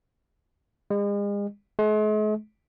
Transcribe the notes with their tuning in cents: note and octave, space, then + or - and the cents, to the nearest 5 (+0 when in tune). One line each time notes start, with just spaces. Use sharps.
G#3 -40
G#3 +45